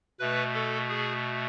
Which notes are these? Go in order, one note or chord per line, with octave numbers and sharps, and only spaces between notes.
B2 A3 B4
A4
G#4